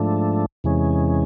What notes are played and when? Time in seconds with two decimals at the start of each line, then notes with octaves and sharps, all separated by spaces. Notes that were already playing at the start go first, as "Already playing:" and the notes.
Already playing: G#2 F3 A3 D4
0.64 E2 C3 E3 G#3 C#4